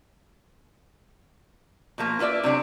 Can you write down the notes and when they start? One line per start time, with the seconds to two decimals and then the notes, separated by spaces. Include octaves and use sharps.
1.98 B2 F3 A#3
2.19 E4 F4 B4 D5 E5
2.44 C3 F#3 D4